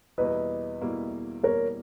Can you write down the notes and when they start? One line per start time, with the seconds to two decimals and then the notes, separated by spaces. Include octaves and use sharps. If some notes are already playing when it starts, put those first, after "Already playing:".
0.18 E2 B2 G3 A#3 E4 B4 D#5
0.81 E2 B2 G3 A#3 E4
1.43 E2 B2 G3 A#3 E4 A#4 C#5